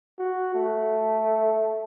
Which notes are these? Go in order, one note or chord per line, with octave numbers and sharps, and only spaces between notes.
F#4
A3